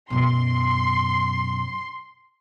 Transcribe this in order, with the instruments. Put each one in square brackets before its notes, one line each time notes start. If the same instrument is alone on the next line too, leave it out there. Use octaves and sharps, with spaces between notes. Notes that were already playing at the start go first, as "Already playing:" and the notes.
[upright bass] F#2 B2 [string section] C6